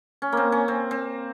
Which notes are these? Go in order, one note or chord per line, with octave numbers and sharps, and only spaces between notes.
C#4
A#3 C4
C#4
C4
C4